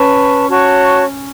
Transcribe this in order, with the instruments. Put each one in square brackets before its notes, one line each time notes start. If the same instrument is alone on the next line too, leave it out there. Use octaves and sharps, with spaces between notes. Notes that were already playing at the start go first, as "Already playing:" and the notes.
Already playing: [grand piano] C#4 [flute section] B4 A5 C#6
[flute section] F#4 C#5 A5 C#6